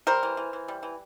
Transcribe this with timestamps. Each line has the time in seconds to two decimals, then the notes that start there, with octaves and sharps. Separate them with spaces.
0.07 G3 A#4 C5
0.23 E3
0.37 E3
0.53 E3
0.68 G3
0.83 E3